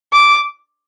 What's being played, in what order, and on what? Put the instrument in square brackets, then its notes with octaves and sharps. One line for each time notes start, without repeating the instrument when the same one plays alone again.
[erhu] D6